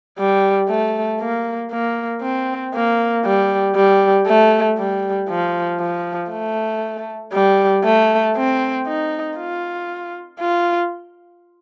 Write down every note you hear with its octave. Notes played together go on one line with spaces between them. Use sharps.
G3
A3
A#3
A#3
C4
A#3
G3
G3
A3
G3
F3
F3
A3
G3
A3
C4
D#4
F4
F4